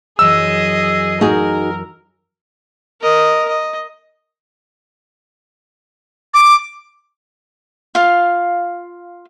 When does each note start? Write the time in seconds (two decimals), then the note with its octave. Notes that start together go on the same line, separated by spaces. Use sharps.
0.19 F#2 E3 F#3 G#4 D#5 E6
1.21 D#4 F#4 G#4 A#4
3.01 A#4 D#5
3.48 D#5
6.34 D6
7.95 F4 F5